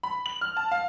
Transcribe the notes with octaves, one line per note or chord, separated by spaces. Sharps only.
B5
F#7
F6
A5
F5